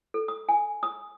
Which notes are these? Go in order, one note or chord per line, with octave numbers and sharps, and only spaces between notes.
A4
D#6
G#5
D#6